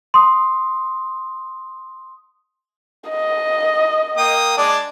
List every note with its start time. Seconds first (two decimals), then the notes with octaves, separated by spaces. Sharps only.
0.14 C6 D#6
3.10 D#5
4.18 A#3 G5 D#6
4.57 G#3 D4 D5